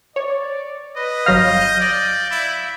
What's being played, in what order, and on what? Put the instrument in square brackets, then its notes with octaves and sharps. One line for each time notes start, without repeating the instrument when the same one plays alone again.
[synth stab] C#5 [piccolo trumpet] D5
[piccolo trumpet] B4 [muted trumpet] D#5
[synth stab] G1 F#3 F6 [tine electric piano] F5 A#6 [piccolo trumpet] G6
[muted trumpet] D5
E4